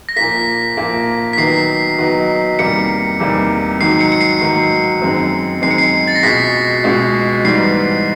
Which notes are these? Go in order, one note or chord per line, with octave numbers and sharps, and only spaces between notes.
A#6
A#2 F3 A#3 B6
A#2 F3 A#3
B6
D#3 F#3 B3 D#4 C7
D#3 F#3 B3 D#4
E2 C3 D#3 G3 A#3 C#7
E2 C3 D#3 G3 A#3
G#2 D#3 F#3 C7
C#7
C#7
C7
G#2 D#3 F#3
F#2 D#3 G#3 C4
F#2 D#3 G#3 C4 C7
C#7
C7
A6
A#6
C#2 B2 G#3 B6
C#2 B2 G#3
G#2 E3 G3 B3 D#4 C7